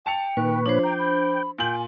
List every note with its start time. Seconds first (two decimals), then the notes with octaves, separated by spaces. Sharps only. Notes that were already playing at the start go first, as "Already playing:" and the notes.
0.06 G5 A5 C#7 F7
0.37 A#2 D#3 B4 C#6
0.66 F3 D4 C5 C#5
0.83 G5 A#5
0.99 B5
1.58 A#2 G5 G#5 F#7